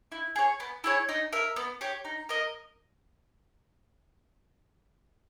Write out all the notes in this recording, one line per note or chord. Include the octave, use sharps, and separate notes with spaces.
E4
G#4 C#5
B3
E4 G#4 C#5
D#4
A#4 E5
B3
G4 C#5
D#4
A#4 D#5